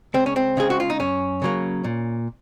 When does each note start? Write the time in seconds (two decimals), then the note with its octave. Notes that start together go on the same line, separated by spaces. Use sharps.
0.14 C#2 C4
0.26 C#4
0.36 C4
0.57 C#3 G#3 G#4
0.70 F#4
0.80 F4
0.90 D#4
0.99 F#2 C#4
1.42 C#3 F#3 A#3
1.84 A#2